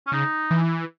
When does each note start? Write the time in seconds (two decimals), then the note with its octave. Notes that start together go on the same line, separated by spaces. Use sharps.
0.07 C#4
0.12 C#3 D#4
0.51 E3